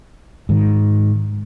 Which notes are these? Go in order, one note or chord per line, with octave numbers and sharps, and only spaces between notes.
G#2 D#3